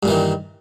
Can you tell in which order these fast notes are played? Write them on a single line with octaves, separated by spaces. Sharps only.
G2 A#2 E3 D#3